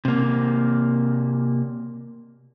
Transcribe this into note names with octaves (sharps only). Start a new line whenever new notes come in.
C3 A#3